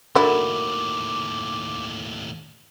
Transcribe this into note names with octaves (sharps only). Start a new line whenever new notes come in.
D#2 A2 F#3 D4 E4 A4 A#4 D6